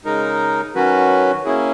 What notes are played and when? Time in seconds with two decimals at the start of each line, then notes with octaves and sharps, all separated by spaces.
0.05 C#3 G#3 D#4 A#4
0.74 D#3 F#3 C#4 F#4 B4
1.45 A#3 C#4 E4 G#4